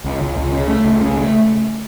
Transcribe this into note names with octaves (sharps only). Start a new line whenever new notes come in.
C#2
C#2
C#2
C#3
A3
C#2
C#3
A3